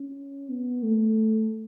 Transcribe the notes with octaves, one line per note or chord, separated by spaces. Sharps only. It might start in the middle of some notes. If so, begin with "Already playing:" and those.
Already playing: C#4
B3
A3